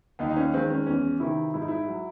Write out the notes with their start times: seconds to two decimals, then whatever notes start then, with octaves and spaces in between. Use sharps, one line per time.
0.19 D#2 D#4
0.29 D#4
0.36 C#4
0.53 D#3 G#3 C4
0.70 C#4
0.86 E2 C#4
1.20 C3 D#3 E4
1.54 G#2 E4
1.62 D#4
1.68 E4
1.87 F#3